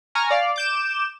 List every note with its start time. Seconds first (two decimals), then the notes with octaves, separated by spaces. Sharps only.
0.15 G#5 A#5 C#6 F6 A#6
0.31 D5 F5
0.56 D6 G6 E7